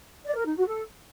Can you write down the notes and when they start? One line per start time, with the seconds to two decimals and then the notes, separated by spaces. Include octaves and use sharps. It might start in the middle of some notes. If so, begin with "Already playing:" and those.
0.25 D5
0.35 A#4
0.46 D#4
0.56 F#4
0.66 A4